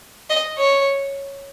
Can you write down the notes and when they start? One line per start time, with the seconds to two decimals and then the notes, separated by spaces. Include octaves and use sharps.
0.30 D#5
0.58 C#5